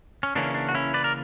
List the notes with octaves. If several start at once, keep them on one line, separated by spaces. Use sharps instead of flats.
C#4
C#3 E3 A#3 C#4 D4
D4
F#4
C#4 E4
B4 D5
A#4